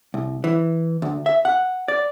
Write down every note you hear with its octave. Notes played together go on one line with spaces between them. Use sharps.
C2
E3
D2
E5
F#5
D5